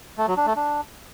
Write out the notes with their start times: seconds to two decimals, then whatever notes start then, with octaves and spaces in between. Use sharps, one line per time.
0.18 A3
0.28 F#3
0.37 D4
0.47 A3
0.56 D4